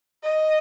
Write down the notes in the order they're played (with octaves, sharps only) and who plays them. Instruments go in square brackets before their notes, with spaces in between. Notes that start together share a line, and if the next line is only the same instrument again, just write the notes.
[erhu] D#5